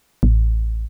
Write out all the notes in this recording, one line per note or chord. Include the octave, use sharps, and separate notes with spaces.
A1